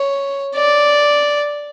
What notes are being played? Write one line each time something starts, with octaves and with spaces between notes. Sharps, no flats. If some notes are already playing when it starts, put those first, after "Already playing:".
Already playing: C#5
D5